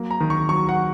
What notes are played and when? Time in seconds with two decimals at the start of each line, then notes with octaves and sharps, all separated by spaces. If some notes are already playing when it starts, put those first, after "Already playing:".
Already playing: F#3 A#3
0.11 A#5
0.20 D#3
0.30 C#6
0.49 F#3 C#6
0.69 F#5